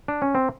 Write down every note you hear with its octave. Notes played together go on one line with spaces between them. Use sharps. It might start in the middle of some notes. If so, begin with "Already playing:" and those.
D4
C#4
C4